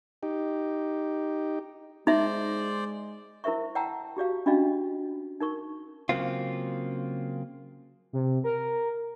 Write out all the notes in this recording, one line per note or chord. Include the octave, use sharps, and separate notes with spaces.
D#4 G4
G#3 D#4 C5 D5 E5
E4 A#4 C5 E5 C#6
D5 F#5 G5 A5 A#5 E6
F#4 G4 D5 F5
C#4 D4 F4 F#4 D#5 F5
D#4 A#4 C#6
C#3 F#3 A#3 C4 F4
C3
A#4